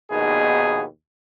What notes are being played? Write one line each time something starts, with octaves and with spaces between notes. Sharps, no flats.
A#1 D#2 B2 B3 D#4 G#4